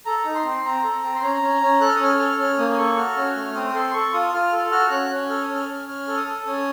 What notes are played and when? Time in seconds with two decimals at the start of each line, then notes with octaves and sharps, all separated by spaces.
0.06 A4 A#5
0.25 D#4
0.35 C6
0.44 C4
0.64 C4 A#5
0.84 A4
1.03 C4
1.16 C6
1.22 C#4 A#5
1.42 C#4
1.61 C#4
1.81 A4 F#6
1.88 F6
1.96 D#6
2.00 C#4 F6
2.19 A4
2.39 C#4 F6
2.58 A#3 D#6
2.73 D#6
2.78 A4 C#6
2.96 F#4 F6
3.17 C#4
3.35 A3
3.55 C4 D#6
3.75 A4 C6
3.93 A4 C#6
4.13 F4 D#6
4.33 F4 F6
4.52 A4
4.71 F#4 F6
4.90 C#4 F#6
5.10 C#4
5.29 A4 F6
5.42 D#6
5.49 C#4
5.55 F6
5.69 C#4
5.88 C#4 F6
6.07 A4
6.17 D#6
6.27 A4
6.46 C#4 D#6